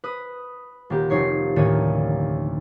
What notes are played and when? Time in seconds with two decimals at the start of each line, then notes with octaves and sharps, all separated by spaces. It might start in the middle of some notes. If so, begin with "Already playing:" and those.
0.04 B4 D#6
0.90 D#1 A#3 G4
1.10 F1 D#4 C#5 C7
1.56 D2 A2 D#3 A#3 C#5 D#7